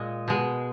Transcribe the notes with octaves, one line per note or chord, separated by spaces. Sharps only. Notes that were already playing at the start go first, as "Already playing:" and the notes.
Already playing: A#2 G#3 D#5
B2 G#3